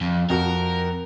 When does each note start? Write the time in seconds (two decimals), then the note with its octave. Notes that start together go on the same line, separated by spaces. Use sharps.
0.01 F2
0.30 F2 F#4 A#4